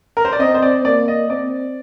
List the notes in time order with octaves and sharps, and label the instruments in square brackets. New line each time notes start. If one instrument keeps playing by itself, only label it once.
[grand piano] A#4
C5
D5
[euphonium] C4 [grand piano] D#5
[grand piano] C5
D5
[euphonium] A#3 [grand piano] D5
[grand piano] D#5
[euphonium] C4 [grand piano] D5